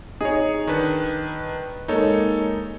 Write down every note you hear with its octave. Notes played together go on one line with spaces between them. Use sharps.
D#4 G#4 C#5
D#3 D4 B4
G#3 A#3 D#4 A4 C#5